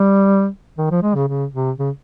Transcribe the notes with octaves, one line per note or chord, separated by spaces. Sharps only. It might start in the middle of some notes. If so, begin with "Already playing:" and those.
Already playing: G3
D#3
F3
G#3
C#3
C#3
C3
C#3